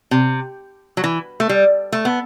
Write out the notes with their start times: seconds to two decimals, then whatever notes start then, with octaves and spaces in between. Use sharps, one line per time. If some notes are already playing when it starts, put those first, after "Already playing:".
0.11 C3
0.97 F#3
1.04 E3
1.40 A3
1.49 G3
1.92 A3
2.05 B3